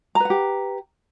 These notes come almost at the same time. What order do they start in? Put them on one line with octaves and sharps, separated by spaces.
A#5 B4 F#5 G4